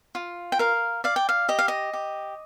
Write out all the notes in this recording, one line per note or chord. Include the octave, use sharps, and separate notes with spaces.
F4
G5
A#4 F5
D5 F5
G5
F5
G4 D#5
F5
D#5
G4